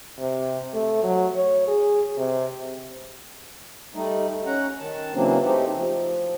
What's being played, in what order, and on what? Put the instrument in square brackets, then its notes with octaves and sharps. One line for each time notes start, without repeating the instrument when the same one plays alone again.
[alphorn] C3
A3
F#3
C#5
G#4
C3
[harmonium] G3 A3 D#4
C#4 F#5 A#5
D#3 A5
C#3 E3 F#3 A#3 C4 D4
A3 C4 D#4 G4
F3